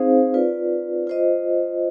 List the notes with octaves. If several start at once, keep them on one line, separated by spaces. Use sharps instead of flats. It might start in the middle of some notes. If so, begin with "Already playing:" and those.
Already playing: C4 D#4 G#4 C5 F5
F4 B4 D5
F4 C5 D#5